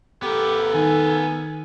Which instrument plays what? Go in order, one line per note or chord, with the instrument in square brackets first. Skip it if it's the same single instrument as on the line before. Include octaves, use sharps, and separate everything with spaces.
[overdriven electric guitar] B3 A#4 [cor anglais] G4 [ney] A4
[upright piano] D#3 [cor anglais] G#5